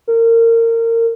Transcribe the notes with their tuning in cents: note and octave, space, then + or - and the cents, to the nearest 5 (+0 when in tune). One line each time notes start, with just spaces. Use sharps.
A#4 -25